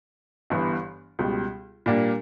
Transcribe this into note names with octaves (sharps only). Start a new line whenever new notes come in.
G1 G2 E3 B3
C#2 B2 G3
A#2 G3 A#3 D4